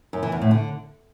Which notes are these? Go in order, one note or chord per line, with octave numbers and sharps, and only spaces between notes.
F#2
E3
E2
A2
D3